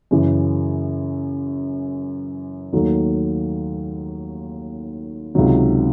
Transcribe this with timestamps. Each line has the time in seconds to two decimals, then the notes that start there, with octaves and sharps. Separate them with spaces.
0.11 F#2 C#3 E3
2.73 D#2 D#3 F#3 A3
5.35 C#2 C3 D#3 F#3